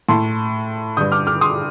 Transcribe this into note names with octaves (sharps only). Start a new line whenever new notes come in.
A2 A5 C6
G2 D3 D#6 G6
D6 F6
D6 F6
C6 D#6